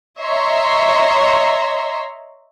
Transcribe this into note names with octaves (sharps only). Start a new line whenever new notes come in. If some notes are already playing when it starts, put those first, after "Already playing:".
C#5 D#5 E5 A#5 C6